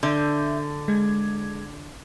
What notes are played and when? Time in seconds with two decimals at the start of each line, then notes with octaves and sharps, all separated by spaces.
0.03 D3 E5 G6
0.88 G#3 G#6